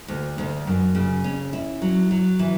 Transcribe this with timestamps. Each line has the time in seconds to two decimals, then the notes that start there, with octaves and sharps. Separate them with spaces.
0.08 D2
0.38 D2
0.67 F#2
0.95 C#3
1.24 C#4
1.53 E4
1.82 F#3
2.11 F#3
2.39 E3